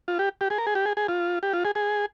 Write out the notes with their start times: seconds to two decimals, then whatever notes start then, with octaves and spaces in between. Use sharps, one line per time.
0.08 F4
0.19 G4
0.41 G4
0.50 G#4
0.58 A#4
0.67 G#4
0.75 G4
0.86 G#4
0.97 G#4
1.08 F4
1.43 G4
1.53 F4
1.65 G#4
1.75 G#4